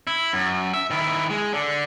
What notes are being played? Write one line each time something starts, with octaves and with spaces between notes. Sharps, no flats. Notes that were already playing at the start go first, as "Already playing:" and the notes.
E4
F#2
E5
D#3 E4
G#3
D3